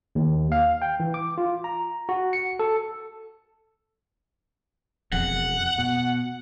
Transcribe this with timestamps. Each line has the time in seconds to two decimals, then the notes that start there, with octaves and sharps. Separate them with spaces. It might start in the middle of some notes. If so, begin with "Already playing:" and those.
0.15 D#2
0.52 F5
0.82 G5
1.00 E3
1.14 D6
1.38 F4
1.64 A#5
2.09 F#4
2.33 C#7
2.59 A4
5.12 E1 F2 F#5
5.78 B2